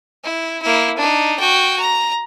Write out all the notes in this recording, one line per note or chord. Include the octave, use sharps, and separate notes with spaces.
E4
A#3 E4
D4 D#4
F#4 G5
A#5